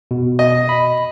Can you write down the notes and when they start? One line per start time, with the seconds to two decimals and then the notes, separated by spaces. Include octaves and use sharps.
0.11 B2
0.39 D#5
0.69 B5